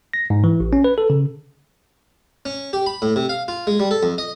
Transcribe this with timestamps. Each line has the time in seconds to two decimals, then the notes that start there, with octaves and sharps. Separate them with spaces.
0.13 A#6
0.30 G#2
0.44 E3
0.60 A1
0.73 C#4
0.84 B4
0.98 A4
1.10 C#3
2.45 C#4
2.73 G4
2.86 B5
3.02 A2
3.16 C3
3.29 F5
3.48 F4
3.67 G#3
3.80 G3
3.91 A4
4.03 F2
4.18 D#5